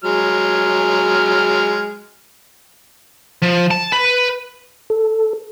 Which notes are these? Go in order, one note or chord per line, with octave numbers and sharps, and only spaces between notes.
F#3 G#3 F6
F3
A5
B4
A4